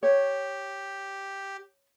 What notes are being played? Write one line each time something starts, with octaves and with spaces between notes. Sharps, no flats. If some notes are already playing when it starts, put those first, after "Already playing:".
G4 C#5